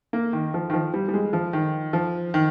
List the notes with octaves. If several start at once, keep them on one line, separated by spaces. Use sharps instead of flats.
A#3
D#3
F3
D#3
F3
G3
G3
G#3
F3
D#3
F3
D#3